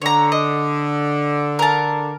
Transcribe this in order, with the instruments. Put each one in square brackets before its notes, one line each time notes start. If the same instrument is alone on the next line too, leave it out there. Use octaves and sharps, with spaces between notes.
[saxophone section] D3 [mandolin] C#5 A#5
[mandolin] D#5
A#4 A5